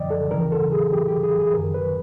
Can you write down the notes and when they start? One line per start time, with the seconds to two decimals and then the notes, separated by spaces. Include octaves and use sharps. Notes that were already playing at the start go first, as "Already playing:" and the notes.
Already playing: F#2 D3 F3 D5 D#5 G5
0.10 A4
0.30 D#2 C#3 E3 A#4
0.52 A4
0.72 G#4
0.93 G4
1.08 G4
1.23 G#4
1.39 G#4
1.54 F#2 D#3 A#4
1.74 B4